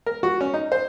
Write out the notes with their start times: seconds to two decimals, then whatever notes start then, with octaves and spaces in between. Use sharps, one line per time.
0.06 A#4
0.23 F#4
0.41 C#4
0.54 D#4
0.72 C5